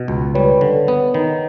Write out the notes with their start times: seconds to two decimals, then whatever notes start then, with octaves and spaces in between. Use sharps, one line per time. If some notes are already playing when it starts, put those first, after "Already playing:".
Already playing: B2
0.08 C#2
0.35 G3 B4 C#5
0.61 D3
0.88 B3
1.14 D#3